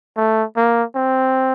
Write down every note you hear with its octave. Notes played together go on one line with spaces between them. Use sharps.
A3
A#3
C4